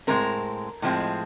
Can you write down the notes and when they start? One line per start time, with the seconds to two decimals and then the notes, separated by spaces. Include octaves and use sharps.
0.07 A2 F3 G#3 C4 A#4
0.82 A2 F3 G#3 C4